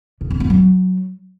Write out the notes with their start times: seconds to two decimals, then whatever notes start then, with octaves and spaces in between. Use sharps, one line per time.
0.21 C#3
0.31 F2
0.40 B3
0.50 F#3